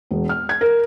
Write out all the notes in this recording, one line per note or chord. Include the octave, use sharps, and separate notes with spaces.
E1
F6
G#6
A#4